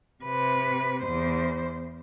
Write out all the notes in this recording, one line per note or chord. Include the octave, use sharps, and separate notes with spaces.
C3 B4
E2 C5